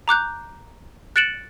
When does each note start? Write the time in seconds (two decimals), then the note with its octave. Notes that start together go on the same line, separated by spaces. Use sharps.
0.08 A#5 D6 F#6 G6
1.16 F#6 A6 C#7 D7 E7 F#7